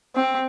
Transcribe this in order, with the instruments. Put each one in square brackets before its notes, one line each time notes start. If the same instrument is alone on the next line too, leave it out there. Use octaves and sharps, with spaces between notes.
[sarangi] C4